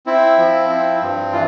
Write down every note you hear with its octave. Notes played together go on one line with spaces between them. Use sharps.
C4 E4
F3
C4
G2
E3 F4